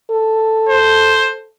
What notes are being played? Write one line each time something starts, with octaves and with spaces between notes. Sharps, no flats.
A4
C5